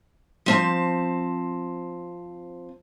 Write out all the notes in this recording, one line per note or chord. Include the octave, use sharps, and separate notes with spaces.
F3 C4 A5